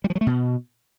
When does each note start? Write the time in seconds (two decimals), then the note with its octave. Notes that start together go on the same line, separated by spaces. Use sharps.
0.04 G3
0.10 F3
0.15 F#3
0.21 A3
0.27 B2